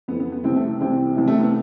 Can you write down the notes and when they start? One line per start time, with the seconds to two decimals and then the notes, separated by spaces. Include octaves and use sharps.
0.08 F2 B3
0.12 E3
0.20 B3
0.32 B3
0.44 C2 C3 E3 C4
0.56 A3
0.80 C2 C3 E3 C4
1.17 C2 C3 E3
1.28 A3
1.40 B3